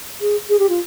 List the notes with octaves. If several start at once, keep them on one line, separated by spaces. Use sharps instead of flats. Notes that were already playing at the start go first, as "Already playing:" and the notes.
G#4
G#4
G4
F4